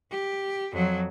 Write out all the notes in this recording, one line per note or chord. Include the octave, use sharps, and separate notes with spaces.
G4
F2 F#3